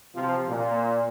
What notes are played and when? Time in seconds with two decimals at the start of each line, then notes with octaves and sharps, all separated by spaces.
0.15 C3 F3
0.49 A#2